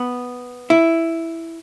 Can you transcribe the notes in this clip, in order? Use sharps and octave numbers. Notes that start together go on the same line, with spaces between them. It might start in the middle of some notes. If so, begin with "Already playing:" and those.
Already playing: B3
E4